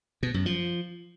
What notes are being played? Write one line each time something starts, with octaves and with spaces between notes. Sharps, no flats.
B2
F#2
F3